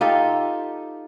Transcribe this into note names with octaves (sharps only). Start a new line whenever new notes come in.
D#4 F4 G4 A4